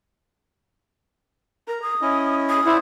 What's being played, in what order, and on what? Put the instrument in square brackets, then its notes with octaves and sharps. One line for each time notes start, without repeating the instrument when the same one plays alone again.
[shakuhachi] A#4 [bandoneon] A#5
[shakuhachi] D#6
[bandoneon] C#4 E4 D#5
[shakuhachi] D#6
[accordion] E4 [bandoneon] C5 D5 F#5